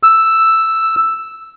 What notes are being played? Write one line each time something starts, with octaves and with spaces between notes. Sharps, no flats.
E6